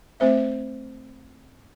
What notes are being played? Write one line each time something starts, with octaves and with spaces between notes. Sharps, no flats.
A3 C4 C5 E5